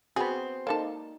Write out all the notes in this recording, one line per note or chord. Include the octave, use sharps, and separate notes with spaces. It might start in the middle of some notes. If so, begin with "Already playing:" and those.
B3 C4 F#4 G#4 F#5 B5
A#3 D#4 A4 D5 A5